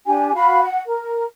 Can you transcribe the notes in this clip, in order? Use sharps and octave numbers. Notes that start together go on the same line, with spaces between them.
D4 G4 G#5
F#4 F5 B5
F#5
A#4